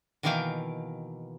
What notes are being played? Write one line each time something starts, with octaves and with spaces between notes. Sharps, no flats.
B2 D#3 E3 A#3 F5 G5